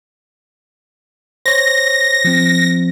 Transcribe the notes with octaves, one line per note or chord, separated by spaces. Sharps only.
C5 C#5 A#6
F3 C4